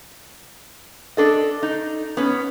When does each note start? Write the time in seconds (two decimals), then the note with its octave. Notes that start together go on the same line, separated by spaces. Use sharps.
1.17 D4 A4 D#5
1.63 D#4
2.17 B3 C#4